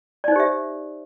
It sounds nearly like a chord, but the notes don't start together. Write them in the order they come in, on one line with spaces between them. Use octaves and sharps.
D5 D#4 C5 G4 E5